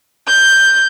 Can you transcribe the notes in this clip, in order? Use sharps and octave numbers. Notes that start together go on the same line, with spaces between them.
G6